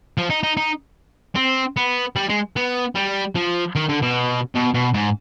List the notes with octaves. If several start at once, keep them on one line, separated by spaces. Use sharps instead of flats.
F3
D#4
D#4
D#4
C4
B3
G3
G#3
B3
G3
F3
D#3
D3
B2
B2
B2
G#2